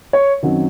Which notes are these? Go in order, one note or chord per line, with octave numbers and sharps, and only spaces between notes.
C#5
F#2 D#3 F#3 C4